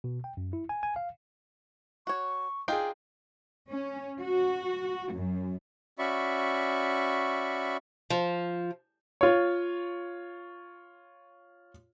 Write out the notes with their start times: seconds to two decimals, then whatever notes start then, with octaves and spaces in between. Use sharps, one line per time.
0.04 B2
0.24 G5
0.37 F#2
0.53 E4
0.69 G#5
0.83 G#5
0.96 F5
2.07 F#4 C#5 C#6
2.68 D4 D#4 F4 G#4 G5
3.68 C#4
4.20 F#4
5.12 F#2
5.99 C#4 F#4 D5 E5 B5 C#6
8.10 F3
9.21 F4 C#5